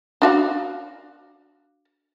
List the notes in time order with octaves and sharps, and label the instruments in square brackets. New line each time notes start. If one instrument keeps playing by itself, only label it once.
[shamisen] D4 F#4 F5